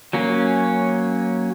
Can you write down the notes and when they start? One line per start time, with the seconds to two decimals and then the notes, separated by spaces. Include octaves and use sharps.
0.13 F#3 A#3 C#4